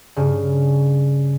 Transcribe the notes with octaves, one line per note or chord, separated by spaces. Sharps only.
G2 C#3